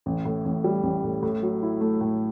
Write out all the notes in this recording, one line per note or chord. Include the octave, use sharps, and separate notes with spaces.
A1
A2
A1
G3
A1
A2
A2
F#3
E4
A3
A2